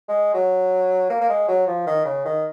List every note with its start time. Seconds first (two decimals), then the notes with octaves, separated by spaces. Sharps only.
0.09 G#3
0.34 F#3
1.10 A#3
1.21 A#3
1.29 G#3
1.48 F#3
1.67 F3
1.87 D#3
2.05 C#3
2.25 D#3